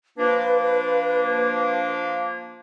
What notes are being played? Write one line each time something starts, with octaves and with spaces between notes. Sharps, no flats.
F3 A#3 D4 B4